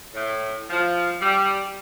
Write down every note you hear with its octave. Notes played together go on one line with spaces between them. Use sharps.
A2
F3
G3